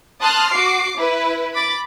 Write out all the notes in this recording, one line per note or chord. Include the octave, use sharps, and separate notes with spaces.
A5 C6 D#6 F6 F#6
F#4 D6 C7
E4 B4
B5 D6 A6